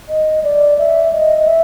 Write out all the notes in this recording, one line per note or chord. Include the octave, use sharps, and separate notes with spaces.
D#5
D5
E5
D#5
E5